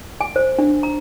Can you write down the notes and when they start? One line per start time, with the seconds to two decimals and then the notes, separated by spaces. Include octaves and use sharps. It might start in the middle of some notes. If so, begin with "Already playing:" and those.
0.21 G#5
0.36 C5
0.59 D4
0.83 A#5